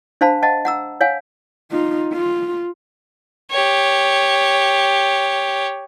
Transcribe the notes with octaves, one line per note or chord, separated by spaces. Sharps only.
D4 C5 F5 A5 B5
D#5 F#5 A5
F#5 A#5 E6
C#5 F5 F#5 G#5
D#4 F4
F4
G4 C#5